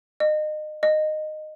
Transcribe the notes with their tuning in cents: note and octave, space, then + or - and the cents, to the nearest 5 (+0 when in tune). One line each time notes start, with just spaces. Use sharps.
D#5 -30
D#5 -15